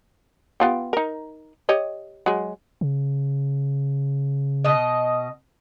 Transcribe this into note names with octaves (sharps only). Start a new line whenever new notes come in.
B3 F4 G4
D#4 A#4
G4 C#5 D#5
F#3 G#3
C#3
B2 D#5